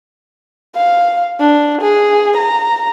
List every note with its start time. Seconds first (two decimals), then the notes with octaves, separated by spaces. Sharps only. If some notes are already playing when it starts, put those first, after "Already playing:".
0.76 F5
1.39 D4
1.81 G#4
2.37 A#5